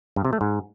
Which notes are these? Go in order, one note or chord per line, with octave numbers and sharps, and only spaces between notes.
G2
C3
A3
G#2